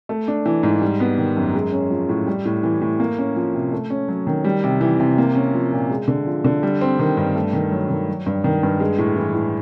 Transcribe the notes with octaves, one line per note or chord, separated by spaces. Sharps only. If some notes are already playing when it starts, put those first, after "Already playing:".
A3
D4
E3
G#2
G3
B3
D#3
F#2
G#3
C#4
F3
A2
G3
A2
E3
A2
A#3
C#4
F3
C3
A3
C#4
F#3
D#3
G3
C3
E3
C3
A#3
C#4
F3
A#2
G#3
D3
F3
D3
G3
C4
D#3
G2
A3
D#3
F#3
D#3
F#3
G2
D#3
G2
G#3
A2
E3
A2